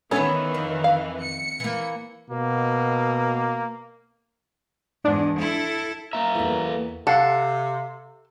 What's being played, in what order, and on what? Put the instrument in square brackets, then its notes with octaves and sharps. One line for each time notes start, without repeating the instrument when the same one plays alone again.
[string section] D#3 E3 [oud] B3 B4 [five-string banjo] C#4 A4 C#5
[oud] F2
[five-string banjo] F5
[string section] C#7
[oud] E3 A#3
[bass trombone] B2 [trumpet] A#3
[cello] E2 G#2 [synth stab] D4
[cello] E4 A4
[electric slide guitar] A#3 E5 [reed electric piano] A#5
[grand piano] E2 E3 [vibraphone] A4 B4
[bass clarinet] C3 [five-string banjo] A4 [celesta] F5 C7 [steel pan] F#5